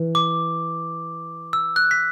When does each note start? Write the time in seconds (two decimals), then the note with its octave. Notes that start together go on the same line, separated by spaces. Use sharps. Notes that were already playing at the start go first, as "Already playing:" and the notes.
Already playing: E3
0.15 D6
1.53 E6
1.76 F#6
1.91 B6